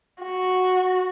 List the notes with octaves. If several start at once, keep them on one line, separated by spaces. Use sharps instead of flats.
F#4